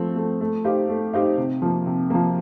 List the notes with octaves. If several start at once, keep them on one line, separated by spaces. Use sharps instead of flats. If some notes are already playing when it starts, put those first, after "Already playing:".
Already playing: F3 A3 C4
A3 C4
A3
D#4 G4 C5 F5
A3
D#4 G4 C5 F5
C3
F3 A#3
C3
F3 A#3